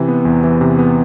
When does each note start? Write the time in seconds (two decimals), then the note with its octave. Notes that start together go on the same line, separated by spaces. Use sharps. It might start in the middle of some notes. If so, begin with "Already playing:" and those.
Already playing: C3 E3
0.08 B3
0.25 E2
0.44 E3
0.61 C3
0.79 B3